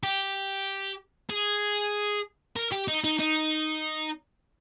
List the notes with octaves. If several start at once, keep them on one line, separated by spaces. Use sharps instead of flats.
G4
G#4
A#4
G4
D#4
D#4
D#4